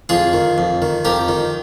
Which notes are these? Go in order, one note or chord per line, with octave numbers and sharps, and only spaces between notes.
F2 F4 G#4
D#3
F2
D#3
F2 G4 A#4
D#3